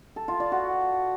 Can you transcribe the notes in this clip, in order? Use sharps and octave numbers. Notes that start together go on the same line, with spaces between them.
A4
F4
D5
F#4